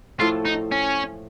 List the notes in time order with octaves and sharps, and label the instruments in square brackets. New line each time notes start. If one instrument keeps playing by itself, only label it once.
[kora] A2 F3 A3 [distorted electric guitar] F4
[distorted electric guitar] D#4
C#4